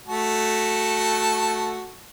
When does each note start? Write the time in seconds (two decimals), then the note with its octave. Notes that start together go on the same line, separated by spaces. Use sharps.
0.08 A3 F#4 A5